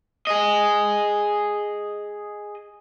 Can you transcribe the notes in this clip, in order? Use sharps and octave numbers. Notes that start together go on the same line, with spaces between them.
G#4 D#5